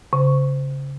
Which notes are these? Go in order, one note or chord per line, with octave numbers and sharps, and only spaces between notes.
C#3